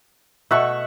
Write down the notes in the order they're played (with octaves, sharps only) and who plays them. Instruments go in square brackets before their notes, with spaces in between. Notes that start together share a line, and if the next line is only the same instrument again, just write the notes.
[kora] B2 A3 [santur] E5 F#5 C#6